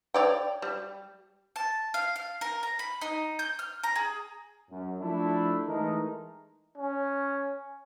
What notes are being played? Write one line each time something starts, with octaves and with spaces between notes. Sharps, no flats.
C#5 D5 G5
G3
A5
F5
F5
A#4
A#5
B5
D#4
G6
F6
A#5
G#4
F#2
F3 A3 D4 E4
E3 G#3 A3 D#4 A#4
C#4